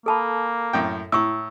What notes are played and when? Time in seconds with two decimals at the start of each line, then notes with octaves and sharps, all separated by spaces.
0.06 A#3 A4 A5 B5
0.73 F#2 A2 G5
1.12 A2 E4 C#6 E6